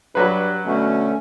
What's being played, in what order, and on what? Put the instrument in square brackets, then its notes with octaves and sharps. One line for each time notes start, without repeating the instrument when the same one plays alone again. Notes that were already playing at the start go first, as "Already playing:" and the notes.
[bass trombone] G2 [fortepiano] F#3 B4
[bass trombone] B2 [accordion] D3 A3 C#4